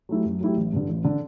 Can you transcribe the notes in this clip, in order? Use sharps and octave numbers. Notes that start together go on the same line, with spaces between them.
F#3 A3 E4 G4
F#2
F#3 A3 E4 G4
A1
G2 D3
A1
D3